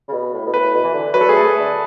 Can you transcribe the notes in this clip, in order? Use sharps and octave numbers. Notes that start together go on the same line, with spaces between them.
C#3
B2
A2
B2
A2 B4
B2
E3
D3
F#3 B4
A4
A3 G#4
A4
A3
D3